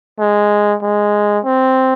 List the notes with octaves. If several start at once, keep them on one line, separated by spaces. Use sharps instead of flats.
G#3
G#3
C4